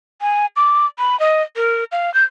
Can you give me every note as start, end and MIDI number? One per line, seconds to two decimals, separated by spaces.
0.21 0.46 80
0.56 0.86 86
0.99 1.19 83
1.20 1.42 75
1.56 1.84 70
1.92 2.13 77
2.14 2.24 91